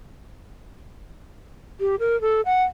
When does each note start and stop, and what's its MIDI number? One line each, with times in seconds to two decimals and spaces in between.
1.80 1.95 67
2.00 2.19 70
2.21 2.41 69
2.45 2.63 78